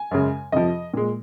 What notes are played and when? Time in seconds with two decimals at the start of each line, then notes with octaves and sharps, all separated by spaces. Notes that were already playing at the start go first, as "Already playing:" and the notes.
Already playing: G#5
0.11 F#2 C#3 G#3
0.52 F2 C3 F3 D#5
0.94 A#2 G#3